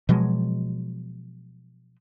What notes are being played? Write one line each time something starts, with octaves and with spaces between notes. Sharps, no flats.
B2 F3 F#3 G#3